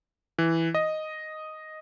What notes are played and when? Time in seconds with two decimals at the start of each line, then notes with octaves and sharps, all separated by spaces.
0.38 E3
0.75 D#5